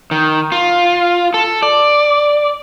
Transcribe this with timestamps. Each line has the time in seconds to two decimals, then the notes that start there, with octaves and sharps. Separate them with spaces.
0.11 D#3
0.52 F4
1.34 A4
1.63 D5